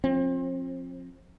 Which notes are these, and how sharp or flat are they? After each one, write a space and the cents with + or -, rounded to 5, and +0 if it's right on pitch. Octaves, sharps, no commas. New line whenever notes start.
F3 +15 C4 +30